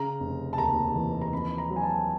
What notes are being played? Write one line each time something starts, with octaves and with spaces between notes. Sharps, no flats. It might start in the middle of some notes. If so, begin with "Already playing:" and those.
Already playing: C#3 A#5
F1
A5
D#2 A#5
E3
A#5
F2 B5
A#5
F#3
G#5
A5